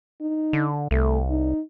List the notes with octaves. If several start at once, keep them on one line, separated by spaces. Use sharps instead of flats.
D#4
D3
C2 A3
D#4